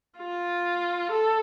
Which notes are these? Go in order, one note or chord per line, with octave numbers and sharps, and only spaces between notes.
F4
A4